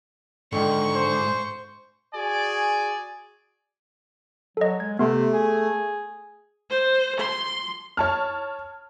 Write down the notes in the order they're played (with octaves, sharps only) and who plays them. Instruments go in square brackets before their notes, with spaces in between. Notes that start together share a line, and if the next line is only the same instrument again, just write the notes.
[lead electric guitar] G#2 [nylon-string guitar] D3 D#3 F3 [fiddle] C#6
[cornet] C5
[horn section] F#4 G#4 D5 G#5
[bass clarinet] F#3 [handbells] A4 D#5
[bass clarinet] G#3 [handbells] G#6
[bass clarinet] C3 [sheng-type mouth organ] A3 [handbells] B3 C6
[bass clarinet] G#4
[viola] C5
C6
[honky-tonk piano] C#5 A5 F6